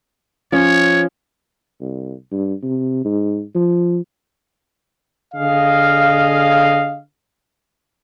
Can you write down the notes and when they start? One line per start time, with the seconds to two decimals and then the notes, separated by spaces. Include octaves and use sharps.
0.52 F3 C#4 C#5
1.81 C2
2.32 G2
2.63 C3
3.05 G#2
3.55 F3
5.34 D3 G#4 D#5 F5